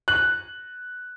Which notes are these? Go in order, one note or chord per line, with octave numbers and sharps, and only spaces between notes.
F#6 F#7